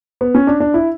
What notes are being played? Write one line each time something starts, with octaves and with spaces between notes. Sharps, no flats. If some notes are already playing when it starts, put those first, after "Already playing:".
B3
C#4
D4
D4
E4